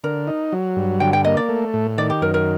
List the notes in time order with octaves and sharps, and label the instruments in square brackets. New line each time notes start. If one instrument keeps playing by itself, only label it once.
[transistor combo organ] D3 [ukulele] A#4
[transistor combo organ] D#4
F#3
G2
[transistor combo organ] D3 [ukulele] G5
[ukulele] G5
[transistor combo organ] A#3 [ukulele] D#5
[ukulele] D5
[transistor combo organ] A3
A2
[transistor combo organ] D#3 [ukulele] D5
[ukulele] G4
[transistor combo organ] F#2 [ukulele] A#4
[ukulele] A#4